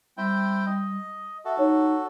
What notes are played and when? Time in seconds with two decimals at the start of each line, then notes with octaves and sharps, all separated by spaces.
0.17 G3 C4 E4 G5
0.66 D#5
1.45 F#4 A4 E5
1.59 D#4 C#5